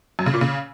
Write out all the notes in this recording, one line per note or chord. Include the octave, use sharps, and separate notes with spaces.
F#2
C#3
A#2
C#3